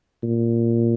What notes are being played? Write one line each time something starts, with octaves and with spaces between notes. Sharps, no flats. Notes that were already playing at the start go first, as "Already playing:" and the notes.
A#2